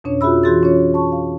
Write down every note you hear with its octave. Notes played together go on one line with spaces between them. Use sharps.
F2 B2 C#4 D4 C#5
F4 F#4 G#4 E5 B5 E6
E3 F4 F#4 G#4 C6 A6
C#4 F4 C#5
A5 C#6
F5